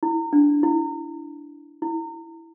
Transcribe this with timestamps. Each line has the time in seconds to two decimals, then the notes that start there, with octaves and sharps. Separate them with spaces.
0.03 E4
0.33 D4
0.63 E4
1.82 E4